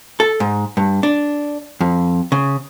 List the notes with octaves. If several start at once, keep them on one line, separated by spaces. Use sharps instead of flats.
A4
G#2
G2
D4
F2
C#3